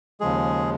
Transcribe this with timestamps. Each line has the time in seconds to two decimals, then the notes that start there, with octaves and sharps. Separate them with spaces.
0.20 D#2 C#3 F3 G#3 G#4